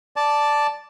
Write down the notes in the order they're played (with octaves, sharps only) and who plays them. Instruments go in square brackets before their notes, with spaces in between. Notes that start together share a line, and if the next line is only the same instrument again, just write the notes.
[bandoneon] D5 A5